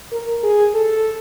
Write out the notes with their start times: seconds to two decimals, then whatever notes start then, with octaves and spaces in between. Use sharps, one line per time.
0.12 A#4
0.43 G#4
0.74 A4